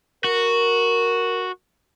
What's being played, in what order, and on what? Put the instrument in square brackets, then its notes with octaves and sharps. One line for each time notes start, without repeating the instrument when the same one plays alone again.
[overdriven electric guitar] F#4 [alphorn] A#4